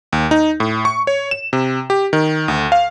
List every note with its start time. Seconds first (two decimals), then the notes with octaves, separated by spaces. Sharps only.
0.13 D#2
0.31 D#4
0.60 A2
0.85 C#6
1.07 C#5
1.31 E7
1.53 C3
1.90 G4
2.13 D#3
2.48 D2
2.72 F5